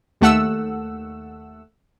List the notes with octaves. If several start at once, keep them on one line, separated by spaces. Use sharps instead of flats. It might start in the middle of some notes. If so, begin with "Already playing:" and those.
D#2 A3 F#5 E6